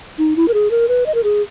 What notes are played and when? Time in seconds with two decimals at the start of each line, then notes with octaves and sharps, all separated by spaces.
0.18 D#4
0.36 E4
0.48 A#4
0.54 G#4
0.71 A#4
0.88 B4
1.06 D#5
1.14 A#4
1.24 G#4